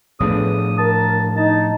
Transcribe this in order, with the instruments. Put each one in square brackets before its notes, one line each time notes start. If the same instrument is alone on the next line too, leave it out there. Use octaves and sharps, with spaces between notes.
[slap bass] A2 F3 D4 [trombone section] A3 B3 G#4 [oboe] D#6
[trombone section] A#4 [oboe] A5
[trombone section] D#4 [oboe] A5